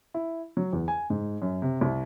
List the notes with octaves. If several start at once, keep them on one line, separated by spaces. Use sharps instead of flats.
E4
F#3
E2
G#5
G#2
F#2
C3
C2